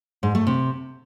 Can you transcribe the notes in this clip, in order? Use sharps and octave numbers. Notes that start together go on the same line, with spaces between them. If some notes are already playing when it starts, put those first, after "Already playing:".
G#2
A3
C3